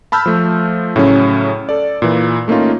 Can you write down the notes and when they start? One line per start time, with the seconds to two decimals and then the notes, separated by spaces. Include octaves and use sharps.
0.12 A5 B5 E6 F6 G6
0.26 F3 A3
0.96 A2 C#3 F#3 C#4
1.69 A4 D5
2.02 A#2 E3
2.48 A3 A#3 C#4 D#4 F4